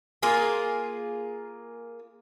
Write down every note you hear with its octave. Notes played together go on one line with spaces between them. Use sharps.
A#3 F4 G#4